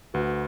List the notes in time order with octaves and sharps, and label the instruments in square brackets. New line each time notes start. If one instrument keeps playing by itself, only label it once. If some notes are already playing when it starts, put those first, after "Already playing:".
[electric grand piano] D2 [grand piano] F#4 B4